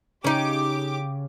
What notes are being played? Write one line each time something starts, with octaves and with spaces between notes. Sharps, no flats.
C#3 C#4 D#4 G4 D6